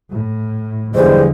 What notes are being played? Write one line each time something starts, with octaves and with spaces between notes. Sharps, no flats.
A2
E2 D3 E3 F3 G3 G#3 C5